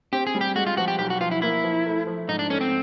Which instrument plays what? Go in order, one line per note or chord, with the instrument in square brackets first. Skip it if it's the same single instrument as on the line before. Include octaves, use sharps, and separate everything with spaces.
[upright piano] C4 [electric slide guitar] G4
[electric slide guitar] G#4
[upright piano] G3
[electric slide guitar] G4
[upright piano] G#3 [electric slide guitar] F#4
[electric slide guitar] F4
[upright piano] F3 [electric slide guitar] F#4
[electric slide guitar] G4
[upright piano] B1 [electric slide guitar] G4
[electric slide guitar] F#4
[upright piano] F3 [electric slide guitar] F4
[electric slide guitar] E4
[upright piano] A#3 [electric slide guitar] E4
[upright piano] F3
A3
F3
[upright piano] G#2 [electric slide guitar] D#4
[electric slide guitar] D4
[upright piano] A3 [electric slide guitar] C#4
[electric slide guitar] C4